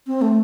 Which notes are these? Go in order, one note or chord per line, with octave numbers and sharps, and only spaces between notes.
C4
A3